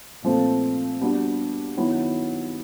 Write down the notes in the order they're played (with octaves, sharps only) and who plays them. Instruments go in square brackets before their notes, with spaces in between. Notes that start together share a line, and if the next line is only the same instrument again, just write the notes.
[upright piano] A#2 F3 A3 C4
G3 B3 D4 F#4
D#3 F#3 B3 E4